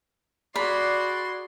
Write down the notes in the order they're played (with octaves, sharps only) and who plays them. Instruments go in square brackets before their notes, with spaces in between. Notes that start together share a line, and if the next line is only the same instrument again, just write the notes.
[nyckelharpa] F#4 G#4 [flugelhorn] D5 [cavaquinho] B5 [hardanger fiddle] C6